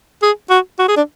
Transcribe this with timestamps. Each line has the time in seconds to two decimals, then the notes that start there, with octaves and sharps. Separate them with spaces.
0.23 G#4
0.50 F#4
0.79 F#4
0.88 G#4
0.97 D4